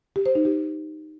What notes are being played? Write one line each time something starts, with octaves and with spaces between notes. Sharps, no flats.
G4
C5
D#4
G4